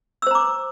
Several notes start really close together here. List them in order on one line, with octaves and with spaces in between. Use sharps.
E6 C5 A#5 D6